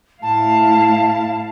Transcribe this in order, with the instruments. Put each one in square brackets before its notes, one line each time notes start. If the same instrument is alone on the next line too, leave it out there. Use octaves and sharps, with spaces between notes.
[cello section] A2 E4 F5 [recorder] A5